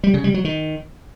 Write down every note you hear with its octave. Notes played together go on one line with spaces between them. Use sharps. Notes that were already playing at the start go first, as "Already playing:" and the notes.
G3
C#3
G3
F#3
D#3